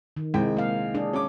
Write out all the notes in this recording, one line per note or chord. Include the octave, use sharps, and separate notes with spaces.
D#3
C2 G#3 G5
A#3 F5
D4 G#4
C#4 D6